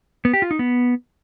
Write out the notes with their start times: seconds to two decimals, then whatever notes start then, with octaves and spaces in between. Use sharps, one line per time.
0.25 B3
0.33 G4
0.42 F4
0.51 D#4
0.59 B3